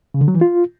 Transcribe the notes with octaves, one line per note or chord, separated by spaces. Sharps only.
C#3
D3
F#3
E3
F4